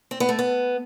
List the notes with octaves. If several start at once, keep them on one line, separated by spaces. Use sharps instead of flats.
C4
B3
A3
B3